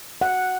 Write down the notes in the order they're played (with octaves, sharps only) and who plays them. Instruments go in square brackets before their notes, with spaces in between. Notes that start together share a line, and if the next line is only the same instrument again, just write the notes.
[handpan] F#5